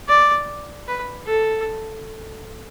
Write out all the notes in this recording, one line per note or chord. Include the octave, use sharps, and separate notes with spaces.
D5
B4
A4